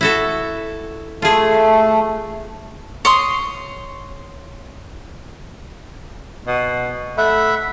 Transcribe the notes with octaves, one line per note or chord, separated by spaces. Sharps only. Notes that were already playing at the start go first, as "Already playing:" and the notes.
E4 F#4 A4
A3 F4 G#4
C#5 C6 D#6
B2
A3 E5 F#5 B5